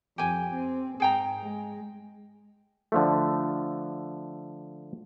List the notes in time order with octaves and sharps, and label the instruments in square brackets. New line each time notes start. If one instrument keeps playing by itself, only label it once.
[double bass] F2 [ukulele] G4 G#5
[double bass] C4
[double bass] G#2 [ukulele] G#4 G5 A#5
[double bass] G#3
[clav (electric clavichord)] D3 F3 A3